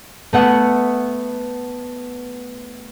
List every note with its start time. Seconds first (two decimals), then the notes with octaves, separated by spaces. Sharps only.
0.33 A3 B3 F#5 E6